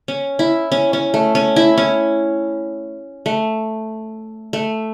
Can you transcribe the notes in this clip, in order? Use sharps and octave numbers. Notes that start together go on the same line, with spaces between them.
C#4
E4
C#4
C#4
A3
C#4
E4
C#4
A3
A3